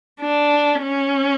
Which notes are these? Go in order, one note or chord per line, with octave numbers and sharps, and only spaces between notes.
D4
C#4